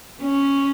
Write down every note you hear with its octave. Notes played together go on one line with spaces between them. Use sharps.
C#4